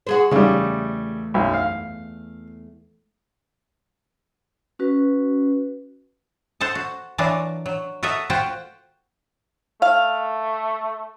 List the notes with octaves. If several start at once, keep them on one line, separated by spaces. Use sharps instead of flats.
F#4 G#4 C5
E2 C#3 G3 A3
B1 F#2
F5
C#4 F#4 B4
A4 C5 F#5 A5
F#4
E3 F#3 D4 F4 A#4 D5
F#3
F#4 A4 A#4 D#5 E5
F4 F#4 C5 F#5 G5
A3 F5